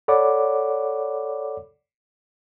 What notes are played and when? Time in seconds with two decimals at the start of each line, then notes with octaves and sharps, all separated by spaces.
0.08 A4 C#5 D5 F#5 B5 D6